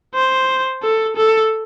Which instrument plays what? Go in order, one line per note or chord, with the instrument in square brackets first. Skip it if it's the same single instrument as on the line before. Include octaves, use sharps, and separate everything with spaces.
[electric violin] C5
A4
A4